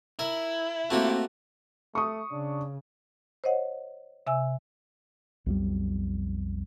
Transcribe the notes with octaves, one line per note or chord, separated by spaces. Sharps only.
E4 A#4
A3 A#3 C4 F#4 G4
A3 C#6 D#6
C#3 D4
C5 C#5 D#5 F#5
C3 E5 G#5 E6
B1 F2 G3